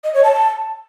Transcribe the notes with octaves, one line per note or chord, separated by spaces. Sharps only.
D#5
C#5
A5